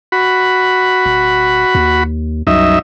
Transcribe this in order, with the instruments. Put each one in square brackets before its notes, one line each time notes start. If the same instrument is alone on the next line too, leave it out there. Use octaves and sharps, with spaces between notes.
[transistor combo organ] F#4 B5
[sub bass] D1
D#2
[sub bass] C2 [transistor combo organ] F#2 D#4 E5